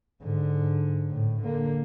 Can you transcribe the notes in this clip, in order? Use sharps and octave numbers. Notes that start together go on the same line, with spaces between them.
G#2 D3
A2
D3 A#3